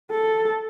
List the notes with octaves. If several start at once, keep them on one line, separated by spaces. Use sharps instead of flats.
A4